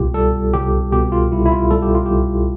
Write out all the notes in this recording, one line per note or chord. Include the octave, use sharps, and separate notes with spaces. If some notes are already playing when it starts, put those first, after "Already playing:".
Already playing: C2 B2 F4 G4
G3 A4
C2 G4
B2 G4
F4
C2 E4
E4
F4
G3 A4
G4
F4
C2 G4